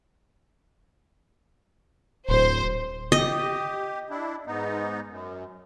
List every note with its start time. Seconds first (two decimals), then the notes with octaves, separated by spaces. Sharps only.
2.29 D1 C5
3.12 G4 D#5
4.10 D4 E4
4.46 G#2 B3 D#4
5.07 F#2